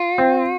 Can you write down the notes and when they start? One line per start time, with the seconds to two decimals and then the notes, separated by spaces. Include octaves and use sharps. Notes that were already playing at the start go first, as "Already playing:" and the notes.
Already playing: F4
0.18 C4